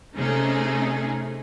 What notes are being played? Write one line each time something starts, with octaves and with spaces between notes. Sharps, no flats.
C3 A3 C#4 D#4 G#4